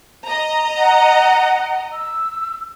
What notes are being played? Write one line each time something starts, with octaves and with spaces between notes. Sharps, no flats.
D#5 A#5
F#5
E6